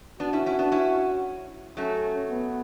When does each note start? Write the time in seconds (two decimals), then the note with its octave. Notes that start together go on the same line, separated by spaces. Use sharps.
0.20 B3 D4 F#4
0.33 C#4 E4
0.46 C#4 E4
0.59 B3 D4
0.72 C#4 E4
1.77 F#3 A3 C#4
2.30 B3